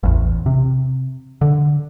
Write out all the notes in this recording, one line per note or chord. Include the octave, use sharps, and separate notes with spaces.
A1 E2
C3
D3